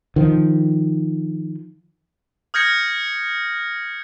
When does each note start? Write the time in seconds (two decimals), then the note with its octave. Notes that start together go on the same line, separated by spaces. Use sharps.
0.16 D#3 F3
2.54 D#6 F6 G6 G#6 A#6 C#7